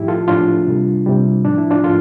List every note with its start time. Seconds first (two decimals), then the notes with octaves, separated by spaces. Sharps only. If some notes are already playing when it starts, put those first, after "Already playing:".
Already playing: A2 F3 E4 G4
0.08 F4 A4
0.27 A2 F3 D4 F4
0.67 C3 G3
1.06 C3 G3
1.45 A2 F3 D4
1.58 E4
1.70 D4 F4
1.84 A2 F3 F4 A4